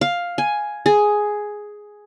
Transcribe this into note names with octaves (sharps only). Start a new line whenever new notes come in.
F5
G#5
G#4